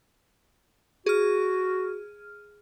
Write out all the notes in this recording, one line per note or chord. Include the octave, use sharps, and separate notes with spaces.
F#4 G#4 F6